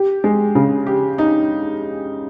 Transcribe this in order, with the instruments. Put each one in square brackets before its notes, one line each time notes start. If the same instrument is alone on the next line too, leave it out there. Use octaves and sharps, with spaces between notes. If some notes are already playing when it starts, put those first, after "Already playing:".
Already playing: [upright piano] G4
G#3
C#3
G4
D#4